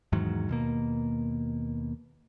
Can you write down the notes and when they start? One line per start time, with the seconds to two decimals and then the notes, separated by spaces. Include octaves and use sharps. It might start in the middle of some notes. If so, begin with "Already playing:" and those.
0.12 E2 G#2 D#3 F#3
0.49 D#2 B2 A#3